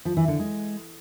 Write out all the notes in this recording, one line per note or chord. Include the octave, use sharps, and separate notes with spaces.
F3
E3
D3
G#3